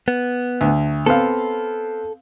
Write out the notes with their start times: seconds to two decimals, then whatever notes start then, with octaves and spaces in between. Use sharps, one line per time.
0.08 B3
0.61 D2
1.06 B3 C4 A4 F5